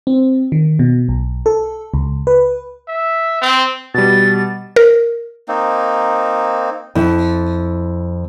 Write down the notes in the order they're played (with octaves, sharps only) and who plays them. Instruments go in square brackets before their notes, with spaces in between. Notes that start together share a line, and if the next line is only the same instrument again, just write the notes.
[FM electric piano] C4
D#3
B2
B1
A4
C#2
B4
[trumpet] E5
C4
[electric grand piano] B2 G3 [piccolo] A6
[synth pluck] A#4
[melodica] A#3 C4 D#4
[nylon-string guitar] F2 E4